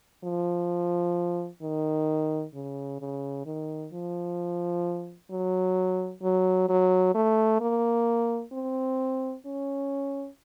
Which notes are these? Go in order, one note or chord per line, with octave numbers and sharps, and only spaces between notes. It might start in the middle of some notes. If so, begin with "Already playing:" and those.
F3
D#3
C#3
C#3
D#3
F3
F#3
F#3
F#3
A3
A#3
C4
C#4